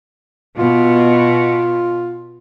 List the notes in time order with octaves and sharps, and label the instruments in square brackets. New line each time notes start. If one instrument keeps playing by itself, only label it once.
[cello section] B2 [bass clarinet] F4